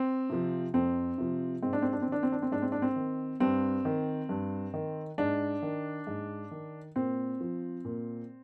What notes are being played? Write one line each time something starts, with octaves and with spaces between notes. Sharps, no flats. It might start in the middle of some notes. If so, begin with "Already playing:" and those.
Already playing: C4
C3 F3
F2 C4
C3 F3
G#2 C4
D4
C4
D4
C4
D#3 D4
C4
D4
C4
G#2 D4
C4
D4
C4
D#3
G2 C4
D#3
G2
D#3
G#2 D4
D#3
G#2
D#3
A#2 C4
F3
A#2